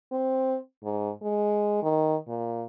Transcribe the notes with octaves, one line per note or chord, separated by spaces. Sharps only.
C4
G#2
G#3
D#3
A#2